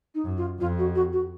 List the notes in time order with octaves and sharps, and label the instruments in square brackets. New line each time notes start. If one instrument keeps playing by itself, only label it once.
[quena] D#4
[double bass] F#2
[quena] F4
[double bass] F2 [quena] F4
[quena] F#4
F#4
F#4